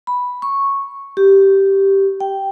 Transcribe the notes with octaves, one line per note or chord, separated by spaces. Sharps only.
B5
C#6
G4
G5